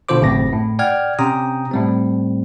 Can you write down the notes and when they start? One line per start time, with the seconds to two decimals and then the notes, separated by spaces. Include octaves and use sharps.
0.09 B2 D3 F4 C5 D6
0.21 G#1 F#2 A2 C#3 C4 A#6
0.53 A2
0.79 D5 F#5 G5 F6 G#6
1.19 C3 C#4 G5 A#5 D#6
1.72 A2 G3 C4